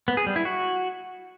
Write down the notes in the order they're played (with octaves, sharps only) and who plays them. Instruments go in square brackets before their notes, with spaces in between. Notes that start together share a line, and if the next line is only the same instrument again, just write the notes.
[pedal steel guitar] B3
G#4
G3
E4
F#4